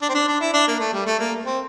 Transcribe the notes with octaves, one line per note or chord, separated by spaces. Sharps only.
D4
C4
D4
D4
E4
D4
A#3
A3
G3
A3
A#3
C4